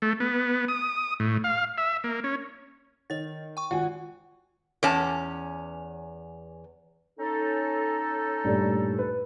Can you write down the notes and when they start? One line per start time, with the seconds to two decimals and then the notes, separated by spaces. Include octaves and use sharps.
0.02 A3
0.20 B3
0.68 D#6
1.20 A2
1.44 F5
1.78 E5
2.04 A#3
2.24 C#4
3.10 D#3 C#5 A6
3.57 G5 C#6
3.71 G#1 F4 F#4 F#5 G#5
4.83 E2 C#4 A5
7.19 C#4 D#4 A4
8.44 G2 A#2 A3
8.98 B4